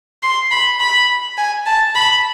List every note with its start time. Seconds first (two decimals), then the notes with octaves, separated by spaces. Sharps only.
0.23 C6
0.51 B5
0.80 B5
1.38 G#5
1.66 A5
1.95 B5